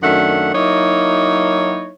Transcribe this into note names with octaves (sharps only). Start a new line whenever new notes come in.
F#2 D#3 A3 D4 F#5
F#3 A#3 D#4 E4 C#5